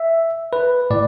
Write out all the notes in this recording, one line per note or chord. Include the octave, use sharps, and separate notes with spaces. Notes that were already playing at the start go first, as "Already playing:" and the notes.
Already playing: E5
B4
A2 D5